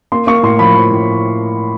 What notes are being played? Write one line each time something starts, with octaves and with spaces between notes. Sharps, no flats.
A#3 C6
A#3 C#6
A2 C6
F3 B5
F3
A2